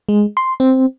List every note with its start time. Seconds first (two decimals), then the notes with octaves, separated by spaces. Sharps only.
0.09 G#3
0.37 C6
0.60 C4